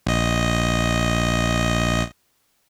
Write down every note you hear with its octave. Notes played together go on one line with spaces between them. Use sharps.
A#1 D#5